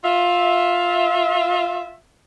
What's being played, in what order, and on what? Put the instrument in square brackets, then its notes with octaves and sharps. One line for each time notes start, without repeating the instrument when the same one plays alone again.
[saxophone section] F4 E5